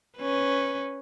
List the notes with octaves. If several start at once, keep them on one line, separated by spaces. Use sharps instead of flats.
C#4 B4